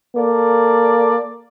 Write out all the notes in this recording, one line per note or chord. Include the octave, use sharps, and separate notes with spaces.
A#3 A4 D5